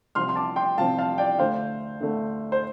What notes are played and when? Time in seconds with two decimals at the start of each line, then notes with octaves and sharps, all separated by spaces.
0.15 C2 C3 F3 C4 C6 F6
0.29 C6
0.36 A5 D6
0.56 G5 C6
0.78 C2 C3 F3 C4 F5 A5
0.98 F5 A5
1.18 D5 G5
1.39 D2 D3 A3 C5 F5
2.00 D2 D3 A3
2.52 C5